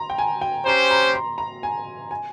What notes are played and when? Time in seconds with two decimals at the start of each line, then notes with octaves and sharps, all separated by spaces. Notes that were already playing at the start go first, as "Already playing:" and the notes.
Already playing: A#5 C6
0.10 G5
0.18 G#5
0.41 G5
0.66 C#4 G4 C5 A#5
0.91 A#5
1.14 C6
1.38 A#5
1.63 G#5
2.11 G#5